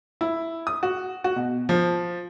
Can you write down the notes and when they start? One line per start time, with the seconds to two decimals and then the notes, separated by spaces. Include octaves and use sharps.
0.21 E4
0.67 D#6
0.83 F#4
1.24 F#4
1.36 B2
1.69 F3